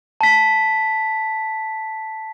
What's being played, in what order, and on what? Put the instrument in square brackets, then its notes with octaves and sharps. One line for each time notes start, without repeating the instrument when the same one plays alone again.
[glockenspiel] A5 B6